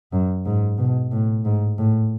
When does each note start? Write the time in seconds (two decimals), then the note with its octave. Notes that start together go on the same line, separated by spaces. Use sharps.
0.12 F#2
0.46 G#2
0.78 B2
1.12 A2
1.45 G#2
1.78 A2